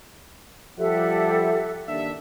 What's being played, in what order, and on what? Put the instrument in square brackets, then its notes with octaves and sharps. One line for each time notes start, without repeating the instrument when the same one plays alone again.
[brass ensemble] F3 G3 F#5 [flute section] G4 A4 E5
[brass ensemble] D#2 D4 E5